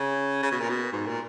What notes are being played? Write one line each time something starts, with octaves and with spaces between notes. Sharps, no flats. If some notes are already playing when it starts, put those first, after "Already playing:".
Already playing: C#3
C#3
B2
A#2
B2
G#2
A#2